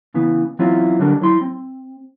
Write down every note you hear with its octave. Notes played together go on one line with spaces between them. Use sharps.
C#3 E3 B3
E3 F#3 C4 C#4 E4 F4
D3 F#3 G3 D4 A#4
F#3 E4 C6
C4